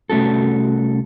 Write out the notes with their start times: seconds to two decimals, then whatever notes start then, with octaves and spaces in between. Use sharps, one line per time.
0.10 C2 A3 C#4 F#4 A4